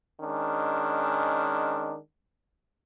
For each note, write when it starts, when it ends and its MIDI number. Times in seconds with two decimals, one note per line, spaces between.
0.21 1.95 51
0.21 1.95 56
0.21 1.95 61
0.21 1.95 62